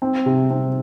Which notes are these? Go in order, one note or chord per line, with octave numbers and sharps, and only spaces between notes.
C4
C3
C4